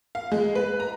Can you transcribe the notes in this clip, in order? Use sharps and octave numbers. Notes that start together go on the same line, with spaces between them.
F5
G#3
B4
A#5